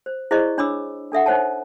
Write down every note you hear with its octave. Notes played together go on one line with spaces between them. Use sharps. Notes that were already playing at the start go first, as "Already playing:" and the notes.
C5
E4 G#4 C5 D5 D#5 C#6
D4 C#5 B5 D6 E6
D4 A4 E5 F#5
D#4 C5 C#5 F#5 A5